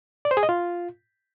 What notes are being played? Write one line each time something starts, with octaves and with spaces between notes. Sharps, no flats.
D5
C5
G#4
D#5
F4